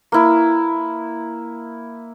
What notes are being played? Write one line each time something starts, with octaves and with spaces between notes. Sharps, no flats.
A#3 E4